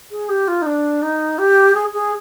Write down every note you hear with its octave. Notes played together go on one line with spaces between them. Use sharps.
G#4
G4
F4
D#4
D4
D#4
G4
G#4
G#4